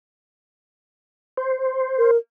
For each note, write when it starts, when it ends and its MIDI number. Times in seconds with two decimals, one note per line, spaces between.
1.37 2.11 72
1.98 2.17 70